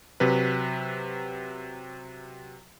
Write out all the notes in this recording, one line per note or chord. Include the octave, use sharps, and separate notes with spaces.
C3 F#3 B4